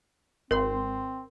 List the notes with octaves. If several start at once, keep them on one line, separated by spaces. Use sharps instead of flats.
G#1 C4 A#4 C6